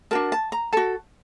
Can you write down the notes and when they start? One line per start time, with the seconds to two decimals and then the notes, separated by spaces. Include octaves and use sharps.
0.11 D4 F#4 A#4 A5
0.32 A5
0.52 A#5
0.73 F#4 A4 A5